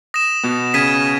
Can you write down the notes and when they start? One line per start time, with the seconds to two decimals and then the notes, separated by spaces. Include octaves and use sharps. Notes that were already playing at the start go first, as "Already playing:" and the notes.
0.14 D#6 A#6 E7
0.43 B2 B3
0.74 C#3 C#4 G#6 B6 D#7